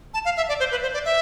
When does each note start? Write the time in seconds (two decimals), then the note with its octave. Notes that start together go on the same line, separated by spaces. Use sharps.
0.14 A5
0.25 F5
0.37 E5
0.49 D5
0.60 C5
0.71 B4
0.82 C5
0.94 D5
1.05 E5